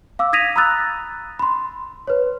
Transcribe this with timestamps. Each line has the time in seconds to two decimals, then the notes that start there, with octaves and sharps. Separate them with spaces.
0.19 F5 D6 E6
0.33 D#6 G#6 A#6 B6 D#7 F7
0.56 A#5 B5 D#6 E6 F#6 A6
1.39 B5 C6
2.07 B4 C#5